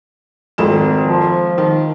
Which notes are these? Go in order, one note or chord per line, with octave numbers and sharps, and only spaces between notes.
G#1 F2 E7
F3
D#3